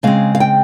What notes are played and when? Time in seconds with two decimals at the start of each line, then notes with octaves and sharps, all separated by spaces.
0.03 C#3 G#3 C4 F5
0.35 F5
0.40 G5